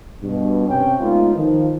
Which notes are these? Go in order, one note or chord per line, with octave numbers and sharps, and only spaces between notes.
G2 B2
C3 C#4 G5
G#3 A3 B3 C#4 D#4 F4
D#3 F3